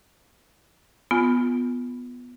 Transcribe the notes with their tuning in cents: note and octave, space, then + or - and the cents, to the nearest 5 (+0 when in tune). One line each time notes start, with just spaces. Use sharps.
B3 +0 F4 +0 G#5 +0